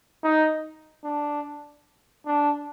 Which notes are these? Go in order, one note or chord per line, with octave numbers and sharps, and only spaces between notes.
D#4
D4
D4